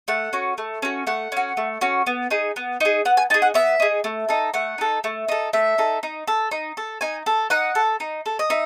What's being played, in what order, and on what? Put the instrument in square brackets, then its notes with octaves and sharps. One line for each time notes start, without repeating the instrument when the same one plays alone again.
[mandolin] A3 F#5
C#4 F#4
A3
C#4 F#4
A3 F#5
C#4 F#4
A3
C#4 F#4
B3
D#4 G#4
B3
D#4 G#4
B3 F#5
G#5
D#4 G#4 A5
F#5
B3 E5
D#4 G#4
A3
D#4 A4
A3 F#5
D#4 A4
A3
D#4 A4
A3 E5
D#4 A4
D#4
A4
D#4
A4
D#4 G#5
A4
D#4 F#5
A4
D#4
A4
D#5
D#4 E5